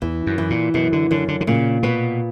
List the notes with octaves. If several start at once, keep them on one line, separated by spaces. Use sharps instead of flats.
E2 E3
F#2
E3
A#2
F#2 B2
D3
F#2 D3
D3
D3
A#2 C#3
B2 B3